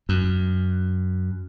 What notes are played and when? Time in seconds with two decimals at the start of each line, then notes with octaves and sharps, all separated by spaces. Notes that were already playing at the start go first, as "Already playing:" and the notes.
0.09 F#2